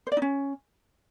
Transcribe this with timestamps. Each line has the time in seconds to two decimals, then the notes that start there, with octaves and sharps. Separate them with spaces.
0.07 C5
0.12 D5
0.17 D#4
0.22 C#4